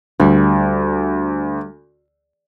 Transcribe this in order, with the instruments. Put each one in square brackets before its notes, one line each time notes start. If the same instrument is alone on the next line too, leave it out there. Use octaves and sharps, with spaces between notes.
[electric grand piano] D2 [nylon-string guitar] G3